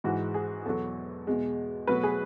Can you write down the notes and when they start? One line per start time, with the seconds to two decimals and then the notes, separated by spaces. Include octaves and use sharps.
0.04 G#2 E3 G#3 F#4
0.34 G#4
0.65 E2 B2 F#3 A4
1.27 E2 B2 G#3
1.87 B2 F#3 A3 B4
2.03 G#4